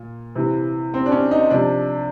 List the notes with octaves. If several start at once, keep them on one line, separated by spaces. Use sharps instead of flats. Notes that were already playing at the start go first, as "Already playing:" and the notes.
Already playing: A#2
C3 E3
C4
D4
C#4
D#4
C3 F3 D4